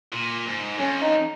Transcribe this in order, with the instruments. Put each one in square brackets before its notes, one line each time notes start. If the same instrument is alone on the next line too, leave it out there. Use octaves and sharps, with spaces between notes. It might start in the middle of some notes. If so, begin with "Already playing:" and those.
[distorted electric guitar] A#2
G#2
[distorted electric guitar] F2 [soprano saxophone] C#4
[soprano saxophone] D#4